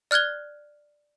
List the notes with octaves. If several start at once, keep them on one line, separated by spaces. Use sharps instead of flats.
D5 F6 F#6 G#6 G7